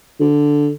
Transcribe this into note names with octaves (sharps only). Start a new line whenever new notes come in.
D3